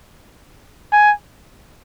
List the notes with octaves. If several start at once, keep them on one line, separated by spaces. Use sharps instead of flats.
G#5